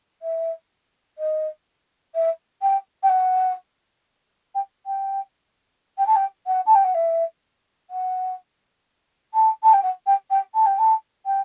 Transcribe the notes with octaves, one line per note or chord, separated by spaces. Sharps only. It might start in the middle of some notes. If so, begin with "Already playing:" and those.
E5
D#5
E5
G5
G5
F#5
G5
G5
G5
A5
G5
F#5
A5
G5
F#5
E5
F#5
A5
A5
G5
F#5
G5
G5
A5
G5
A5
G5